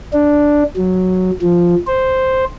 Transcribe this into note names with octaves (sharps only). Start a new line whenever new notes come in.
D4
F#3
F3
C5